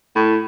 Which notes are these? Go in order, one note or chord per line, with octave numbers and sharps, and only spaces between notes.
A2